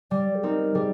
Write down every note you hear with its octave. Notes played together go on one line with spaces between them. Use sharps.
G3 D5
G#4
C4 D#4 A#4
G3 G#4